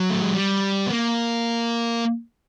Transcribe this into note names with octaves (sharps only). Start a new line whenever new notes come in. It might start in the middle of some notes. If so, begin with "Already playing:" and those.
Already playing: F#3
A3
G#3
G3
B3
A#3